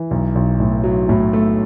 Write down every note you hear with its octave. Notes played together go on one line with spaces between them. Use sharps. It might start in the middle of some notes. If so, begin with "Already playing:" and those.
Already playing: E3
B1
B1
A2
F#3
A2
A3